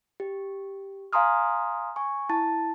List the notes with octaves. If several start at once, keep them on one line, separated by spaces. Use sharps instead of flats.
G4
F5 G#5 A#5 C6 D#6 F6
G#5 C#6
E4 A5 A6